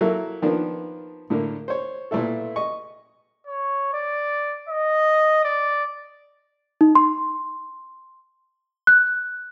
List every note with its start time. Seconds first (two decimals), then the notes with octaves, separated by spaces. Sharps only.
0.01 F#3 A#3 E4 A4
0.42 D#3 F3 A#3 B3 D4
1.30 A2 D3 A#3
1.68 C5 C#5
2.11 A#2 A3 B3 E4 A4
2.56 D#5 C#6
3.47 C#5
3.93 D5
4.69 D#5
5.44 D5
6.81 D#4
6.95 C6
8.87 F#6